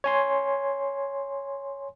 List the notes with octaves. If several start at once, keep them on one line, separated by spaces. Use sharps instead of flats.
C#5 G#5 C6